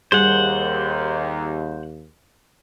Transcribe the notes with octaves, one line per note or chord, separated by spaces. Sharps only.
D#2 G3 G#4 C5 F#5